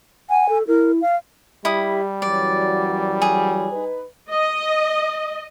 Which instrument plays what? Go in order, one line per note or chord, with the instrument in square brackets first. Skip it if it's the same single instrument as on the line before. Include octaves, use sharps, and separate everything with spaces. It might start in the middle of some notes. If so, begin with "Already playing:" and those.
[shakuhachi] F#5 [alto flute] G#5
[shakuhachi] A4
[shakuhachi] E4 [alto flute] A#4
[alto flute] F5
[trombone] G3 [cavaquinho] E4 D#6 [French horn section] G4
[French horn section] F#2 E3 F#3 [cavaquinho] D5
[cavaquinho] G#4
[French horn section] D#4 B4
[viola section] D#5